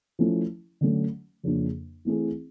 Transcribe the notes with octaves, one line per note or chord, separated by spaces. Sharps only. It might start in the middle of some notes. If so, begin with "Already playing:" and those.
F3 A3 C#4 E4
D3 F#3 A3 C#4
F2 C#3 F3 A#3 D4
E3 A3 C4 E4 G#4